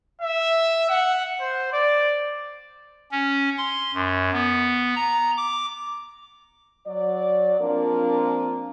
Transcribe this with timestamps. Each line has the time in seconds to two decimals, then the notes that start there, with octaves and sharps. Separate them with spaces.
0.21 E5
0.89 F#5
1.41 C5
1.72 D5
3.12 C#4
3.58 C6
3.94 F#2
4.33 B3
4.95 A#5
5.37 D6
6.86 F#3 D5
7.60 F3 A#3 C4 D4 F4 A#4